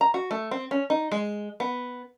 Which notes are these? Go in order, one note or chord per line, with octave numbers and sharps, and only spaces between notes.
A#5
F#4
A3
C4
C#4
D#4
G#3
B3